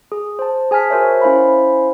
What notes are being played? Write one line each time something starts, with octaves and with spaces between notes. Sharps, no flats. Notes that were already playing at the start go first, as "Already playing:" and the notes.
G#4
C5 A5
G#4 G#5 A5 F6 B6
F#4 A#4 C5 C#5 E5
C#4 E4 C5 F5 G#5 B5